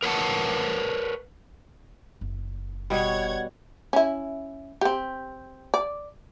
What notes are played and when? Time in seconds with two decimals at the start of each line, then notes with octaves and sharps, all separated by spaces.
0.03 A#4 B4 C#5 F#5 A5
2.21 F#1
2.90 B2 G3 C#5 F#5 G#6
3.93 C#4 E4
4.81 C4 G4
5.74 D5